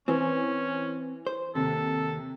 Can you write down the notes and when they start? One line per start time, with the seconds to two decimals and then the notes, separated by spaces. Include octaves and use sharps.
0.08 E3 C4 C#4 C5
1.27 C5
1.55 D#2 C3 A4